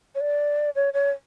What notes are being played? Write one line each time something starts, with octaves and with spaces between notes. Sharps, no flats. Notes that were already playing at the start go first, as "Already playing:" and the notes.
C#5
D5
C#5
C#5